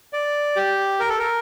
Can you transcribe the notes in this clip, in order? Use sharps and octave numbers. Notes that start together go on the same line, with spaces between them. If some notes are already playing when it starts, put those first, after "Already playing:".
D5
G4
A#4
A4
A#4